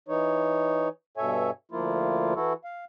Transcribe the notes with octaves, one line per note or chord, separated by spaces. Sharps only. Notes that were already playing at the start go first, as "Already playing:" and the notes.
E3 D#4 C#5
G2 B2 A4 C#5 E5 G#5
D2 F3 A#3 E4 F4
E3 E4 F#4 A4
F5